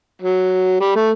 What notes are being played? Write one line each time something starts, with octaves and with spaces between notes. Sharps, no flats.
F#3
G3
A3